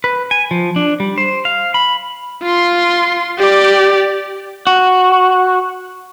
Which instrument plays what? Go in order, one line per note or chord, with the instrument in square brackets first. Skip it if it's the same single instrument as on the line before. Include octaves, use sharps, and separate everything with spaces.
[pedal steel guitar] B4
G#5
F3
D4
G3
C5
F5
B5
[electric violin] F4 C6
G4 D5
[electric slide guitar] F#4